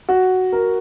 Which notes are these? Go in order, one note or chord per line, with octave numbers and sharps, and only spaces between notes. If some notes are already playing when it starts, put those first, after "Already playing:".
F#4
A#4